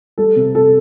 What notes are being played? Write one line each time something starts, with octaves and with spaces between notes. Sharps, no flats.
G3 A4
C3
C3 A4